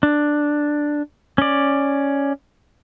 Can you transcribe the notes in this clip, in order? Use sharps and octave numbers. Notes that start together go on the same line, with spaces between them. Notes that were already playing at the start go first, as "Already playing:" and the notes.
D4
C#4 D5